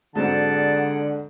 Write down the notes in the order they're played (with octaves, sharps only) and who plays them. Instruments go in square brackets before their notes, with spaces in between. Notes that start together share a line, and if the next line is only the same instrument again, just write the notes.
[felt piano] G#2 F#3 C4 [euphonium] D3 [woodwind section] G#4 D5 F#5 [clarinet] A5